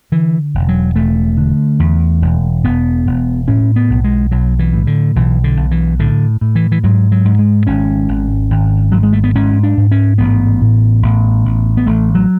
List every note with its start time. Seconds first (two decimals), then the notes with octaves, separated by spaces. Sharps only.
0.12 D3 E3
0.54 E1
0.68 F#3
0.96 E1 A3
1.37 D3
1.80 E2
2.22 E1
2.64 E1 B3
3.06 E1
3.48 A2 C#4
3.76 B3
3.90 B1
4.04 G#3
4.31 B1 F#3
4.59 E3
4.74 A2
4.87 D3
5.16 B1 E3
5.44 D3
5.57 B1
5.71 E3
5.99 A2 D3
6.41 A2
6.55 E3
6.72 E3
6.84 G#2 F#3
7.12 F#3
7.25 G#2
7.39 G#3
7.67 G#1 C#4
8.09 G#1
8.51 G#1
8.92 G#2 F#3
9.03 G#3
9.13 A3
9.24 B3
9.35 G#2 C#4
9.63 D4
9.77 G#2
9.92 C#4
10.18 A1 B3
10.61 A2
11.02 A1
11.45 A1
11.77 B3
11.87 A1 A3
12.15 F#3